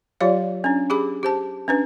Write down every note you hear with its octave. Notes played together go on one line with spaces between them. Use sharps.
F#3 F4 G4 C#5 D5 F5
C#4 D4
G4 G#4 B5 D6
G4 C5 A5
C#4 D4 B4